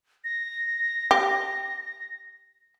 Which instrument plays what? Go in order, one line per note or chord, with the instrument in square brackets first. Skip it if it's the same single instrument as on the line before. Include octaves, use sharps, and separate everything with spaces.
[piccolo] A#6
[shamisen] G4